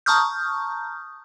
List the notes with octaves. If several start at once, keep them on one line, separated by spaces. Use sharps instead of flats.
A5 A#5 C#6 D#6 F6 G6